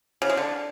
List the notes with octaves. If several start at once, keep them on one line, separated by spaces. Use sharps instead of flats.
C#3
G#3
D3